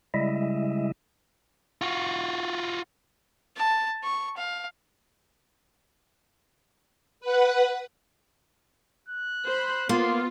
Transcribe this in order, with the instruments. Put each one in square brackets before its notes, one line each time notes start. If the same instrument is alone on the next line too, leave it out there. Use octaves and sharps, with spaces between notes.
[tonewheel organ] C#3 G3 G#3 E4 D#5 E5
[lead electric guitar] F4 F#4
[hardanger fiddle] A5
C#6
F5
[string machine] B4 F#5
[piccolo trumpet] F#6
[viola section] C5 B5
[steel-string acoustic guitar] A#3 [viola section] B3 F4 [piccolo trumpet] C6